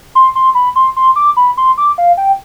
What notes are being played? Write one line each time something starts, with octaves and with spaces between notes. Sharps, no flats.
C6
C6
B5
C6
C6
D6
B5
C6
D6
F5
G5